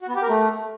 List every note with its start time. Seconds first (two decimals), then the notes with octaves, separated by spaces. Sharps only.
0.01 F#4
0.08 B3
0.15 G4
0.22 A#4
0.29 A3